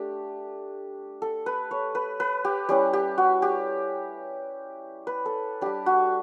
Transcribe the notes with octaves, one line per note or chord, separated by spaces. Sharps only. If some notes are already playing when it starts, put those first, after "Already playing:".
Already playing: A3 D4 G4
A4
B4
C#5
B4
B4
G4
G3 C#4 E4 G4
G4
F#4
G4
B4
A4
G3 D4 G4
F#4